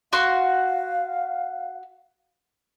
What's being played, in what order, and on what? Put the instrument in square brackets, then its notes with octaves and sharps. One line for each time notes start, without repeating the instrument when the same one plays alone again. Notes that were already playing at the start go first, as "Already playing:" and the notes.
[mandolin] F#4 C6 [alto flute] F5